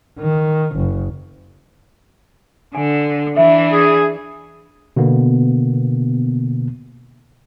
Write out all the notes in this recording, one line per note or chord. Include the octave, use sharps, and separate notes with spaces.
D#3
F#1
D3 G#5
E3 D4 E5
G#4
B2 D3 A#3 B3